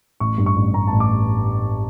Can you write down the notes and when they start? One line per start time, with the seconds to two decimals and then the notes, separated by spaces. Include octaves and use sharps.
0.20 A1 C#6
0.38 G2
0.46 C#6
0.56 A1
0.74 A1 A#5
0.87 A5
0.92 A1
1.00 D6